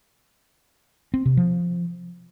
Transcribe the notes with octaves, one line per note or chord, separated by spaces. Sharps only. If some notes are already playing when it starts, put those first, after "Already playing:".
C4
C3
F3